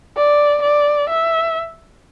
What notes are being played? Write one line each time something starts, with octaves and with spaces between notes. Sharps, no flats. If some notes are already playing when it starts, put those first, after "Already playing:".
D5
D5
E5